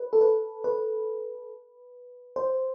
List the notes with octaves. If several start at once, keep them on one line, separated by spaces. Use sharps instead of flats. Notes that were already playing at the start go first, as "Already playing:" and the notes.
Already playing: B4
A4
B4
B4
C5